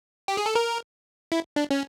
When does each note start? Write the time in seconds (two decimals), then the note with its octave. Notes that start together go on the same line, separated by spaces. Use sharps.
0.28 G4
0.37 G#4
0.46 A4
0.55 A#4
1.32 E4
1.56 D4
1.70 C#4